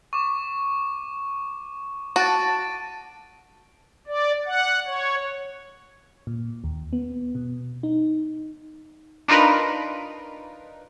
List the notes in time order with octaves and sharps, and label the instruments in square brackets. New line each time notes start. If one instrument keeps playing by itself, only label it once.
[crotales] C#6 D6
[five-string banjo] F#4 [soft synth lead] A5 [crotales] A6 D7 D#7
[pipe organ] D5
F#5
C#5
[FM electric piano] A#2
D#2
B3
B2
D#4
[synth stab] D4 D#4 F4 A#4 B4